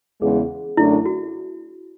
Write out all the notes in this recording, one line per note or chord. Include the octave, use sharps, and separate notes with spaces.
E2 C#3 G#3 B3 G#4
F#2 D3 A3 D4 E4
F#4